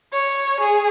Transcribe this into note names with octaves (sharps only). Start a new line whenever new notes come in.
C#5
G#4